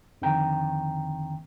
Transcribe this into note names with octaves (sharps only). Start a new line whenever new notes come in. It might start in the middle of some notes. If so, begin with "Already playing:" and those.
F2 D3 D#3 C4 G5 A#5